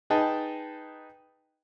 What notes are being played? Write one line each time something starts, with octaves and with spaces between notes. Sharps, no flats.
D#4 G#4 B4 D#5 G5 A5